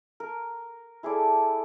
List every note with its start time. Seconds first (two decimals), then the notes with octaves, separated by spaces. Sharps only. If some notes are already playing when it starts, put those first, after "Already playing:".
0.20 A#4
1.03 E4 G#4 A4 D5